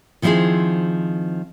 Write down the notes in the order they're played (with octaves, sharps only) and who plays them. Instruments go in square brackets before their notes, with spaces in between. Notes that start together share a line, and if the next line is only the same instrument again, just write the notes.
[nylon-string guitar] D#3 F3 C4 C#4 E4 G#4